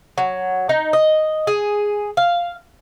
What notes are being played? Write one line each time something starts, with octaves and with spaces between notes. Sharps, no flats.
F#3
D#4
D#5
G#4
F5